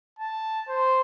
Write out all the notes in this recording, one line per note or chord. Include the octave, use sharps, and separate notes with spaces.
A5
C5